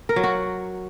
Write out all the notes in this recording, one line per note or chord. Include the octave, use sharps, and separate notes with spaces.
A#4
F#3
F#4